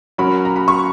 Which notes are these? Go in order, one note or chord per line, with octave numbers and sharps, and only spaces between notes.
F#3 C#4 F#4 A#4 B5
A#5
B5
C#6